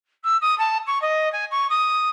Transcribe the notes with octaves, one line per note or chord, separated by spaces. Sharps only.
E6
D#6
A5
C#6
D#5
G#5
C#6
D#6